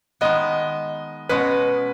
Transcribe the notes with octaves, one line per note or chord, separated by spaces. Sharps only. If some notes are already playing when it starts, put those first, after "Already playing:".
D#3 G#3 B3 D#5
B2 G#3 C#4 B4